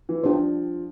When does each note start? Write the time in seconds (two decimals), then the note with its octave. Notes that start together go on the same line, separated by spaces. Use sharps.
0.09 E3
0.24 F3 D4 G4 C5